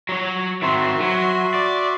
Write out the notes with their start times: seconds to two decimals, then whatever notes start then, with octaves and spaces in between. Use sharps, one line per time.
0.09 F#3 C#5
0.62 D#3 C4 F#4 E5 C6
1.01 F#3
1.54 D5